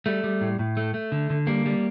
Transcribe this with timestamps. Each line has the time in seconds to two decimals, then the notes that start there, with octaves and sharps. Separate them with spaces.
0.06 G3 A3
0.24 G3
0.41 A2
0.59 A2
0.77 A3
0.94 A3
1.12 D3
1.30 D3
1.47 G3 A#3
1.66 G3